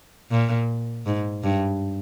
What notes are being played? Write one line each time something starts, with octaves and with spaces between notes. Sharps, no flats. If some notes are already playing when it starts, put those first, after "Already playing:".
A#2
G#2
G2